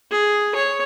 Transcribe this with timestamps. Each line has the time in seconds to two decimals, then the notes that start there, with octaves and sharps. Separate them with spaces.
0.11 G#4
0.55 C#5